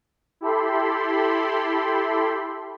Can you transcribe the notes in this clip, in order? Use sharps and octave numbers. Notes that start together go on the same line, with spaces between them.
E4 G4 A4 B5 C6